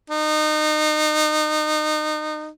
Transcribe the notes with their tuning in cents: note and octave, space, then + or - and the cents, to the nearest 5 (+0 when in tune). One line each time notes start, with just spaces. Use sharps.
D#4 -30